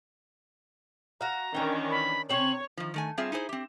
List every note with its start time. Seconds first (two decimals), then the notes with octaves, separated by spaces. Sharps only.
1.21 F#4 F5 A#5
1.55 D#3 E3 C#4 D4 G5
1.91 B5
2.29 C3 C4 C#4 C#5 F#7
2.77 D#3 F3
2.94 D#3 A3 G#5
3.18 G3 C4 F4 G#4 E5
3.32 D#4 E4 G#4 C5
3.49 C4 G4